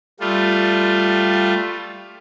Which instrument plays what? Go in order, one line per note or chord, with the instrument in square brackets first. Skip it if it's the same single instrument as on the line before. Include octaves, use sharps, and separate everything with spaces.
[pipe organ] G3 A3 F4